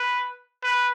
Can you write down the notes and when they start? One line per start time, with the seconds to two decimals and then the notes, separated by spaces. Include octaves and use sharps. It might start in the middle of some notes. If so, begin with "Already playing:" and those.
Already playing: B4
0.63 B4